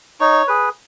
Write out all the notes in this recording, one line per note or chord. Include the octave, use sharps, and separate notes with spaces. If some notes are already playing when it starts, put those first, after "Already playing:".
D#4 C#5
G#4 B4